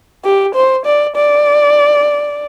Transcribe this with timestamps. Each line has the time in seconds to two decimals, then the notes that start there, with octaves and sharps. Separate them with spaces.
0.25 G4
0.55 C5
0.86 D5
1.16 D5